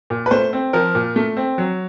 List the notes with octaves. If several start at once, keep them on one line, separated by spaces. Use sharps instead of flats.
A#2
B4
A3 C5
C4
F3 A#4
A#2
A3
C4
F#3